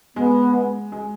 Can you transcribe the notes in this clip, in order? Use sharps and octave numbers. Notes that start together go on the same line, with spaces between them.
G#3 B3
G#3
G#3